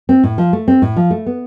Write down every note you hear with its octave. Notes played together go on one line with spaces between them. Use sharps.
C4
A2
F3
A3
C4
A2
F3
A3
B3